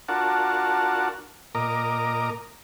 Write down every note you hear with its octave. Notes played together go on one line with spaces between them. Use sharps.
D4 F4 F#4 A#4 F#5 A5
A#2 A#4 D#5 A#5 D6